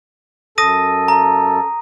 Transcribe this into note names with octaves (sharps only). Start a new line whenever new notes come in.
F#2 A4 D#6 A#6 D#7
A#5